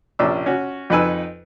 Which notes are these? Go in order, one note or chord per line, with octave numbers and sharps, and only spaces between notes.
A#1 C3 C#4 D4 D6 E6
C#4 F#4
F2 D#4 B4 G#5 E6